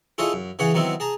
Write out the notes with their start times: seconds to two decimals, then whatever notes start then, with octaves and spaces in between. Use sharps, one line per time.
0.18 E4 F4 G#4 A4 C#5 D#5
0.33 F#2
0.59 C#3 E3 G#4 C#5 F#5
0.74 D#3 F#3 B3 C4 E4
1.00 G#4 A5 A#5